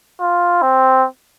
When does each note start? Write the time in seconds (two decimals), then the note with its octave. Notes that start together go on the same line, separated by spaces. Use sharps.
0.21 F4
0.62 C4